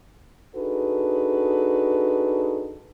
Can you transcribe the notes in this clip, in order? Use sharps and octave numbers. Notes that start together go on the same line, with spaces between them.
D4 D#4 F#4 G#4 A4 B4